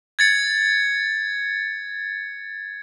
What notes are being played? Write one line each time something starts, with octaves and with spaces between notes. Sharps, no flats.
G#6 A6 C#7